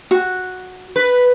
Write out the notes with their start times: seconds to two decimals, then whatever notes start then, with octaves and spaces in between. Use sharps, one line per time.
0.11 F#4
0.96 B4